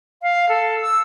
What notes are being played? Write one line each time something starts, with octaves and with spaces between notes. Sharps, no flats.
F5
A4
E6